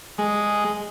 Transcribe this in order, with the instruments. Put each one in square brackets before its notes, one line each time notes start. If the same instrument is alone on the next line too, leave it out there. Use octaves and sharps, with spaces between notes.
[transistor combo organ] G#3